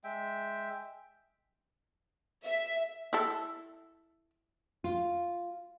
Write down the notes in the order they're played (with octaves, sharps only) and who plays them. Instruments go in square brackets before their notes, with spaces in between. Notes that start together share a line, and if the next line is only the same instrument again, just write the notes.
[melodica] G#3 E5 G5
[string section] E5
[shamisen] E4 A4
[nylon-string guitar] F4